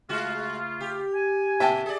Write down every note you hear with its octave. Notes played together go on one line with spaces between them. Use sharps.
C#3 G#3 A3 F4 F#4
G4
G#5
A#2 E5 G5 A5
G#4 D5